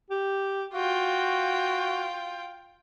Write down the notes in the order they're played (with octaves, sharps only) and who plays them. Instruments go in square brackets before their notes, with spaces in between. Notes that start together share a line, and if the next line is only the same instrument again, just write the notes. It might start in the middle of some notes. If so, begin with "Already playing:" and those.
[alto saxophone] G4
[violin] F4 G5 [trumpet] F#4 [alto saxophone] F5